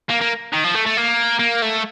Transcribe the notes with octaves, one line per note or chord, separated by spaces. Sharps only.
A#3
A#3
D#3
F3
A3
A3
A#3
A#3
A3